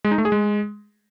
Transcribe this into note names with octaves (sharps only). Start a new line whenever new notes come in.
G#3
D#4
A3
G#4
G#3